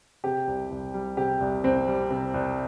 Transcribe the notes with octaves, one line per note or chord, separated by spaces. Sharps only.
C3 G4
C2
C2
G3
C3 G4
C2
C2 C4
G3
C3
C2